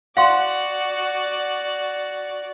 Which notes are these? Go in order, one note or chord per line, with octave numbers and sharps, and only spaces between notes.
F#4 D5 F5 F#5 C6